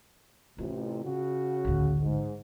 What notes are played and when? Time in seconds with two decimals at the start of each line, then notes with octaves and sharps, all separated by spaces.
0.58 A1 C3 F4
1.04 C#3 F#4
1.65 A1 D2
2.02 G#2